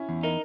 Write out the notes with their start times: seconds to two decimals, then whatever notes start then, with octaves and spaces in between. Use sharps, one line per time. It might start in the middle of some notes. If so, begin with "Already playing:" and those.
Already playing: C#4 E4
0.09 E2
0.23 D#4 A#4